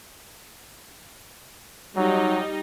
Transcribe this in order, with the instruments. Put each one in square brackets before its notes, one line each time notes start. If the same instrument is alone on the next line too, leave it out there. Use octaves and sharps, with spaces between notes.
[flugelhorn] F#3 [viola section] G3 D#4 D#5